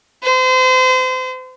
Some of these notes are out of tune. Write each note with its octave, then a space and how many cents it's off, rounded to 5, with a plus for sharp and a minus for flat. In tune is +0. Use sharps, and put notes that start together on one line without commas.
C5 -35